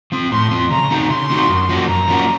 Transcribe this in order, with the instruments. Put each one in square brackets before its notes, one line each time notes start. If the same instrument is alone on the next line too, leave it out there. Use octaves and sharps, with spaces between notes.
[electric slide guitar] F3 C4
[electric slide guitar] A2 [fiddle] C6
[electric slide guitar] F3 C4
[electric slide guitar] C#3 [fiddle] A#5
[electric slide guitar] A3 C4 D#4 F#4
[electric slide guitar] C#3 [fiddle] C6
[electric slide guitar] A3 C4 D#4 F#4
F#2
F3 A#3 C#4 F#4
[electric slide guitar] F#2 [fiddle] A#5
[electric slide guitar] F3 A#3 C#4 F#4